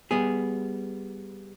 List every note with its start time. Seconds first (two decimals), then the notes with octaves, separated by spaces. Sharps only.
0.11 G3 B3 G#4